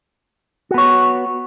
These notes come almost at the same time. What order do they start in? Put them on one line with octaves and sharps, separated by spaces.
F#4 B3 C#5